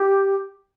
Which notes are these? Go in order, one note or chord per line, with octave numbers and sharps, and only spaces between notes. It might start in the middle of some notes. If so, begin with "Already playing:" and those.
Already playing: G4